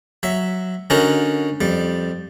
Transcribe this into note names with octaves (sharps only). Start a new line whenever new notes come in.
F#3 E5
D3 C#4 D#4 F#4 A#4
F2 G3